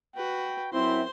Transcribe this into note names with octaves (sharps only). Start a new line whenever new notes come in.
F#4 B4 G5
F#2 C4 E4 C5 C6